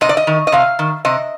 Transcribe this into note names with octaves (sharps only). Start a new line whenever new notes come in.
C3 D#5
D5
D#5
D#3
D#5
C3 F5
D#3
C3 D#5